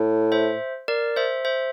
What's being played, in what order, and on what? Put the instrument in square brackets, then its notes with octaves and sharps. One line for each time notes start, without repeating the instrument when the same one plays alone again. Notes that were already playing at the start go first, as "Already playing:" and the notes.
Already playing: [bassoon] A2
[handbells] C5 E5
A#4 D5
C5 E5
C5 E5